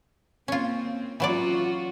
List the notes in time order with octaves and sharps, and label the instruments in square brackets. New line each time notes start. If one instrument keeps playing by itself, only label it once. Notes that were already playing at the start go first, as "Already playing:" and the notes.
[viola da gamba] A#3 C4 [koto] C#4 F4
[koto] E3 F#3 D5 [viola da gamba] C#4 F4 F#4